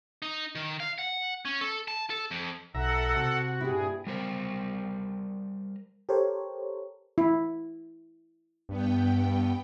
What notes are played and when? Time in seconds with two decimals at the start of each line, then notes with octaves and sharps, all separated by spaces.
0.22 D#4
0.55 D#3
0.80 F5
0.98 F#5
1.45 C#4
1.61 A4
1.88 A5
2.10 A4
2.31 F2
2.75 B1 A4 E5 F#5 A#5
3.16 C3 F#4
3.61 G2 A#2 E4 G4 G#4
4.07 G3 A#4 C5
6.09 G4 A4 A#4 C5 C#5
7.18 E4
8.69 G2 B3 G5